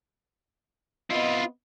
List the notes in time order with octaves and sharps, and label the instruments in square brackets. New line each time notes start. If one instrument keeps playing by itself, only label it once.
[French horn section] B3 C4 D#5 [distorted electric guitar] E4 F4